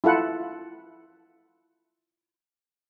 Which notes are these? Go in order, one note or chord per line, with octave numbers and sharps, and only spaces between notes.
E4 F4 A4 F#5